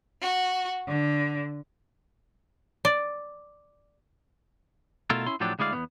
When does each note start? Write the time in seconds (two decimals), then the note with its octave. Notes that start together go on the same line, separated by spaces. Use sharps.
0.22 F#4
0.89 D3
2.85 D5
5.10 B2 A3 E4 F4 A4 A#4
5.27 C#4 E4 C6
5.40 A2 F3 F#3 D4 G4 A4
5.59 D2 G#3 E4 D5 F5
5.73 E2 C#3 B3